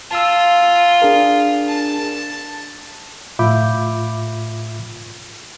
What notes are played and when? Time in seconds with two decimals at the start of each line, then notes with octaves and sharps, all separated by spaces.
0.11 F4 A5 E6
1.02 D4 G#4 A#4
1.68 A5
3.39 A2 F4 E5 B5 D6 G6